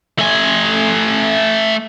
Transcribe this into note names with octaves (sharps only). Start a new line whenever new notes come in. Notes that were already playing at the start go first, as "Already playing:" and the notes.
A3 G#5